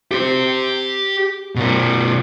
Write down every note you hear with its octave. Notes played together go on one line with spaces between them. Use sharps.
G4 C6
B2 A#4